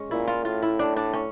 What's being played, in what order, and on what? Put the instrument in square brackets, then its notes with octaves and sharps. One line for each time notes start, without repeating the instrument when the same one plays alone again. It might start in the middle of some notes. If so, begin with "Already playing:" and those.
Already playing: [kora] G#3 C#4
[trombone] A#2 [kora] E4
[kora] F4
[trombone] A2 [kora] F4
[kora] E4
D4
D4
C#4